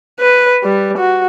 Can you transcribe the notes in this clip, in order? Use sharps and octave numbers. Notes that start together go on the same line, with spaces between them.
B4
G3
F#4